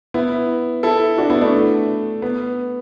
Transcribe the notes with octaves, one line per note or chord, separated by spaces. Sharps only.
B3 E4
E4 A4
D4 F#4
B3 E4
A3 D4
B3